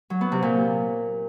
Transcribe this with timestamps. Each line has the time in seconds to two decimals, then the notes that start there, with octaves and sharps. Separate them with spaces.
0.10 F#3
0.21 B3
0.32 C3
0.43 A#2